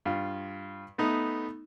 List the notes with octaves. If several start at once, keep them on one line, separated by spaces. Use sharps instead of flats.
G2 F4
A3 B3 D#4